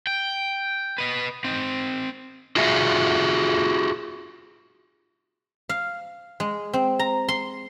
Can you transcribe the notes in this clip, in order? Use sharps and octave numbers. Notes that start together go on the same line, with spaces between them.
G5
B4 D#5
C4 D#4
F4 F#4 G#4 E5
F5
G#3
C4
A#5
C6